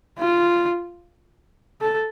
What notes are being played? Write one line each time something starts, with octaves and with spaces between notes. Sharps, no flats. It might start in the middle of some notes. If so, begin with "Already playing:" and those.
F4
A4